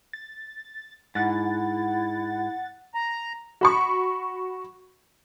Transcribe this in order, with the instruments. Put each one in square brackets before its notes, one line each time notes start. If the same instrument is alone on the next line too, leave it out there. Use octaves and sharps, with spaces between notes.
[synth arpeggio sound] A6
[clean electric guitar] G#2 [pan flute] E4 [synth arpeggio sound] F#5 A6
[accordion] A#5
[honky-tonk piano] F#4 B5 C#6